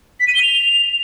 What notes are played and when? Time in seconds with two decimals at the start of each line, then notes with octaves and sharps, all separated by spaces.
0.20 B6
0.28 D#7
0.35 G7
0.43 F7